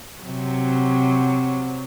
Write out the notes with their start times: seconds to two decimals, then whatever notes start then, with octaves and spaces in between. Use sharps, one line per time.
0.22 C3 F#3